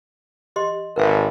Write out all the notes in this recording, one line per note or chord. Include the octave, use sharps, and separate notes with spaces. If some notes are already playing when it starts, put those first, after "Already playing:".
G4 D#5 C6
G#1 A#4 B4 E5